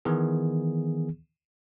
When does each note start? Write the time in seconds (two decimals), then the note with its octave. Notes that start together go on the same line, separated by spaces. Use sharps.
0.05 D#3 E3 B3 G#4